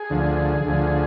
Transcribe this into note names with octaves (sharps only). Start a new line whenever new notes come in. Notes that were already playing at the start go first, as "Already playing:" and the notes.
Already playing: G#4
D2 D3 F3
D2 D3 F3